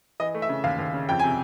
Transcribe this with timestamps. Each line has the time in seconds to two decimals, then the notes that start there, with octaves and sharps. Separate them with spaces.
0.20 E3 D#5
0.34 A3
0.42 E5
0.49 C#3
0.64 D#2 F5
0.79 D#2
0.93 C#3
1.09 F2 G5
1.19 C3 G#5